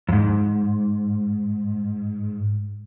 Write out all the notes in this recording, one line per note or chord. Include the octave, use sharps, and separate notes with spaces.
F2 G#2